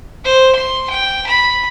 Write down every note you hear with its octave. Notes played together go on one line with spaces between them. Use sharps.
C5
C6
G5
B5